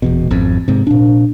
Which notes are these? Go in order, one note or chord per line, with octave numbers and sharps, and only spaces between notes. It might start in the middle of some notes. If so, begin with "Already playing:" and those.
D#1 E2 B2
G#1 F2
G#2 C3
A#2 D4